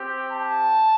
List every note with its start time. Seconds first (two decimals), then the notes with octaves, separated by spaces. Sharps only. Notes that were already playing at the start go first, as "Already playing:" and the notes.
Already playing: C4 G4
0.32 A5